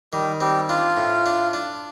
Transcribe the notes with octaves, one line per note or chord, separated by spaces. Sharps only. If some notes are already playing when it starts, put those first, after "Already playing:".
D#3 G3 G4
G3 C4 G4
D4 F4
A2
D4
D4